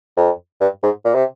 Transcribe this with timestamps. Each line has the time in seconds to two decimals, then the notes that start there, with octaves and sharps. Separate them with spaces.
0.17 F2
0.61 G2
0.83 G#2
1.05 A#2
1.15 C3